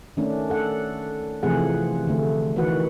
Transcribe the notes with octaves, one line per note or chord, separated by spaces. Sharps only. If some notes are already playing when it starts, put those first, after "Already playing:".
D#3 A3 C#4 D4
A4 F#5
C3 E3 F3 A3 G#4 F#5
D3 A3
D#3 E3 A3 F#4 B4 F#5